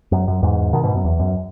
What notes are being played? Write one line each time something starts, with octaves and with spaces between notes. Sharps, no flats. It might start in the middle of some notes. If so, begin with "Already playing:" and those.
F#2
F#2
E2 G#2
B2 D#3
G#2 B2
F#2
E2
F#2